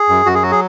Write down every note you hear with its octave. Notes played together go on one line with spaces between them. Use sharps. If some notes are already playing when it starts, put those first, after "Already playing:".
Already playing: G#4
F#2
F#2 F#4
G#4
F#3 F#4
G#4